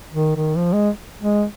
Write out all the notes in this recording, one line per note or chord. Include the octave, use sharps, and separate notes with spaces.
D#3
D#3
F3
G#3
G#3